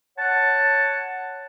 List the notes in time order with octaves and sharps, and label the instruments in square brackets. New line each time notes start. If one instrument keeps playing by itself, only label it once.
[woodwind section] C#5 F#5 A5